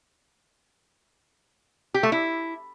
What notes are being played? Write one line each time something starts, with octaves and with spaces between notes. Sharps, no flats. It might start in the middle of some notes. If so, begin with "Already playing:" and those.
G4
A3
E4